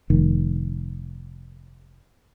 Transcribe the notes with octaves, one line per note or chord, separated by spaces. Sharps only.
F1 D#3